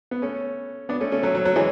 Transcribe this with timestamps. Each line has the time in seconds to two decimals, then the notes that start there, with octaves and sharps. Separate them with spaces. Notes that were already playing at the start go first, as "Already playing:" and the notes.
0.11 B3
0.22 A3 C#4
0.89 B3 D4
1.01 A3 C#4
1.12 A3 C#4
1.23 F#3 A3
1.34 F#3
1.45 F#3
1.56 E3 G#3